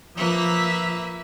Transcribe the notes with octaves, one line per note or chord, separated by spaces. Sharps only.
F3 A#3 B4 E5